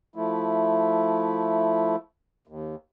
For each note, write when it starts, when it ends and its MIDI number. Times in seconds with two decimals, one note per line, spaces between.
0.16 1.96 53
0.16 1.96 57
0.16 1.96 64
2.47 2.75 39